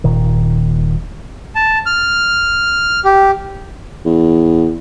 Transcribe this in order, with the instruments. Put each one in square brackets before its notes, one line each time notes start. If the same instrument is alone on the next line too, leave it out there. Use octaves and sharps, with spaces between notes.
[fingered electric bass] D#1 A#2 D#3
[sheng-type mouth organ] A5
F6
G4
[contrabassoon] E2